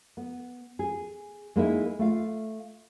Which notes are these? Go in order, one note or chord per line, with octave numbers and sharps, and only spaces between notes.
B3
G#4
G#3 A#3 D#4 E4
A3 F4 F5